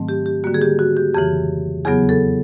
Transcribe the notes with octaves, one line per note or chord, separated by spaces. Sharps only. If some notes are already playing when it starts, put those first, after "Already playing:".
Already playing: G#2 D#3 F#3 A3 C4
G4
G4
D3 G3 A#3 F#4
G#4
G4
F#4
G4
F2 C#3 E3 G4
E2 C#3 F#3 B3 G#4
A4